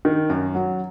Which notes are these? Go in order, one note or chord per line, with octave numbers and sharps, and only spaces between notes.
D#3
F#2
F#3